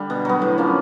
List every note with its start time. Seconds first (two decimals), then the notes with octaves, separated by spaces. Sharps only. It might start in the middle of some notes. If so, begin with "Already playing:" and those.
Already playing: D3 G3
0.10 B2
0.25 F#3 B3
0.42 A2
0.58 F3 A#3 C#4